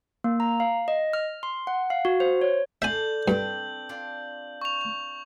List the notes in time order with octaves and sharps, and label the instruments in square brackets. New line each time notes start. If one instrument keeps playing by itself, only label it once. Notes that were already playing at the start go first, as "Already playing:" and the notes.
[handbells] A#3
A#5
F5
D#5
F6
C6
F#5
F5
F#4
C5
C#5
[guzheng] D4 A4 C6 [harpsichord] E5 G#5 [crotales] G6 F#7
[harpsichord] G2 [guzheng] C4 D4 B4
[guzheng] D4 F4
[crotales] C#6 F7